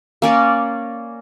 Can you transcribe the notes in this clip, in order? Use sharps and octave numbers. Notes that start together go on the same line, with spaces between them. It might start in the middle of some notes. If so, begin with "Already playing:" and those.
A#3 C#4 D5